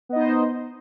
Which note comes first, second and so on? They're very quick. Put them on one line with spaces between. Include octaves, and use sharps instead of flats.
B3 D#5 D#4 C5